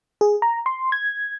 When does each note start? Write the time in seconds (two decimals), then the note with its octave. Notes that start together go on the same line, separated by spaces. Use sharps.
0.21 G#4
0.42 A#5
0.66 C6
0.92 G#6